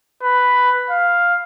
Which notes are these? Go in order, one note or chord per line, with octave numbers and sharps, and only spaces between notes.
B4
F5